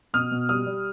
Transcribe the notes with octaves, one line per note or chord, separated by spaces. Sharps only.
B2 D#6 F6
B2
G3 D#6 F6
G3